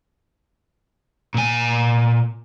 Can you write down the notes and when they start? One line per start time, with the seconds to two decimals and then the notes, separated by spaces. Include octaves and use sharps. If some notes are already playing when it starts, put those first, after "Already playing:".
1.34 A#2 G#5